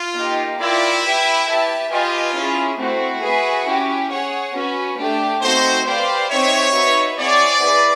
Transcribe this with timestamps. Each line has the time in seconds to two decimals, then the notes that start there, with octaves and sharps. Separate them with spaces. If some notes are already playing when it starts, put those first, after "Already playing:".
Already playing: F4
0.15 A#3 D#4 G4
0.59 E4 F4 A#4 D5 G5
1.03 G4 B4 E5 G5
1.47 G4 B4 E5 A5
1.91 F4 G4 B4 D#5 G#5
2.34 C#4 E4 G#4
2.78 A3 C4 E4 F#4
3.22 G#4 B4 E5
3.66 C#4 E4 G4
4.10 G#4 C#5 F#5
4.54 C#4 F#4 B4
4.98 A3 D4 G4
5.41 A3 C4 D#4 F#4 A4 C5
5.85 G4 B4 C5 D5 F5
6.29 C4 D#4 G4 C5 C#5 E5
6.73 D#4 F#4 B4 E5
7.17 C4 E4 G#4 C#5 D5 F#5
7.60 E4 G#4 B4